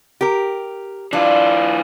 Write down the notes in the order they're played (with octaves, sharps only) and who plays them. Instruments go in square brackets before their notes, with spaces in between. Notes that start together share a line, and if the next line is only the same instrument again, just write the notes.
[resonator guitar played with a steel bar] G4 A#4
[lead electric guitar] E3 F4 [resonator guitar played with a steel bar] D4